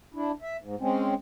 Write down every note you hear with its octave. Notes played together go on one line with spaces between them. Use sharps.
D4 E4
E5
G#2
G#3 C4 C#4